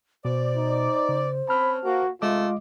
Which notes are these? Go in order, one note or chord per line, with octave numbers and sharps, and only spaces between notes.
B2 C5 D5
D#4
C#3
C4 C#4 A5 B5 F6
A#3 F#4
C3 G#3 A3 F4 D#5 D6